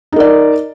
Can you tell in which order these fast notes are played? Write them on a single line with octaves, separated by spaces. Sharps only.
D#4 A#4 D5